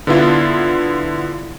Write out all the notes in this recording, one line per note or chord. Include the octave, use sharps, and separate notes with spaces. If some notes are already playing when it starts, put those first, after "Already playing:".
D3 B3 E4 F4